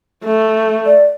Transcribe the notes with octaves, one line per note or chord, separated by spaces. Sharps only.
A3
D5